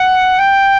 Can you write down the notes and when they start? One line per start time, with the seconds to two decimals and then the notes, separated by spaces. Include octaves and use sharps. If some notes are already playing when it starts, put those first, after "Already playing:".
Already playing: F#5
0.39 G5